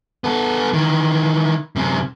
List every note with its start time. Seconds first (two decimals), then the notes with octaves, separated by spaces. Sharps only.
0.24 B3 A4
0.73 D#3 E3
1.76 F#2 C3